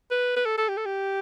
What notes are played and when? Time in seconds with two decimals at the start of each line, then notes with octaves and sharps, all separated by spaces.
0.11 B4
0.36 B4
0.45 A4
0.58 A4
0.68 G4
0.77 A4
0.85 G4